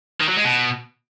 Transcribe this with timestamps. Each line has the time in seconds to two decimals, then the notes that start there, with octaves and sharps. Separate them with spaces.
0.20 D#3
0.29 F#3
0.37 G#3
0.45 B2